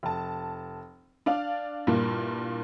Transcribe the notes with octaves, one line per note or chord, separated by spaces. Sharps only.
F1 A5
D4 D5 F5
G2 A#2 A#3 E4